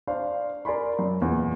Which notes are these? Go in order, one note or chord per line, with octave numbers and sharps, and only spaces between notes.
D4 C5 F5 C6
A#4 D5 G#5 B5 C6
F#2
E2 A#2